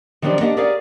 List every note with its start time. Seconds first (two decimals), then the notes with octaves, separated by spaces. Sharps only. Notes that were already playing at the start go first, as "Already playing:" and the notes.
0.22 D#3 F3 F#3 C4 D4 G4
0.41 A#3 D4 G4 A#4 D#5 F#5
0.57 G4 G#4 A#4 C#5 D5 F5